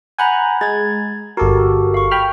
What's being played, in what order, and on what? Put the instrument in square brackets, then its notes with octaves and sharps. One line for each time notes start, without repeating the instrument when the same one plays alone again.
[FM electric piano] F#5 G#5 [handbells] A#5 B5 G6
[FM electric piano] G#3 [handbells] G#6 A6
[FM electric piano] G1 A4 A#4 [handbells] F#4 G4
[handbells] F5 C#6
[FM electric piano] G5 B5 F6